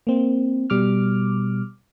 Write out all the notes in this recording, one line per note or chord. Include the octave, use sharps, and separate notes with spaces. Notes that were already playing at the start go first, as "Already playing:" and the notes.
A#3 C4
B2 G3 D6 F6